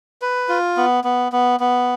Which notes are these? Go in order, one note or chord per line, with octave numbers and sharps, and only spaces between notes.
B4
F4
B3
B3
B3
B3